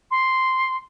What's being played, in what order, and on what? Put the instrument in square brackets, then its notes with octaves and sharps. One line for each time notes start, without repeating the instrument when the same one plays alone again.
[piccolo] C6